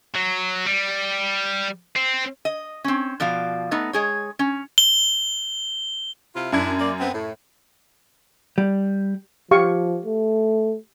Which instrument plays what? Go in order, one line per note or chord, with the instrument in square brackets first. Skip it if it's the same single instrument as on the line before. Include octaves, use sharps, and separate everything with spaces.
[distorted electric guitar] F#3
G3
C4
[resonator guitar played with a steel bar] D#5
C4 C#4
B2 F3 D5 F5
A3 B3 D#4
G#3 G#4 C#5
C#4
[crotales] G7
[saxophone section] C3 E4 F4
[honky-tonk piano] F#2 G#6 [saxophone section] D4 E4
[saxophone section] A#3 D5
B3 C4
A2
[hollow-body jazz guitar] G3
[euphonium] F3 [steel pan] G4 F5 C#6
[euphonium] A3